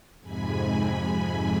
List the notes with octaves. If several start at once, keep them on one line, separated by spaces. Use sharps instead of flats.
F2 G#2 C3 G#5 B5